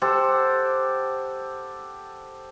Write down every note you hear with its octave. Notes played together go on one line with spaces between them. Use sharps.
G4 A4 C5 F#5